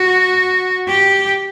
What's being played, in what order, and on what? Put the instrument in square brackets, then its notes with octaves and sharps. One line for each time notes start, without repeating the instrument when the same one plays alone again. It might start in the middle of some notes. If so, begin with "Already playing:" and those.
Already playing: [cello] F#4
G4